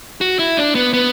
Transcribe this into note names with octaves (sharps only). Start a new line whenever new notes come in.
F#4
E4
D4
B3
B3